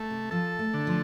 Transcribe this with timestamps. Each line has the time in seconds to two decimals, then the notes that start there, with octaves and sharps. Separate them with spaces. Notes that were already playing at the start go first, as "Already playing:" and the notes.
Already playing: A3
0.10 C3
0.31 F3 A4
0.59 A3
0.74 D3
0.87 F3